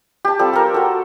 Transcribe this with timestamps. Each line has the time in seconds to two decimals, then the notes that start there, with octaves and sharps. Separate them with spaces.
0.25 G4 A5
0.39 G3 C4 F4 A4
0.53 A4 A#4
0.74 F#4 A4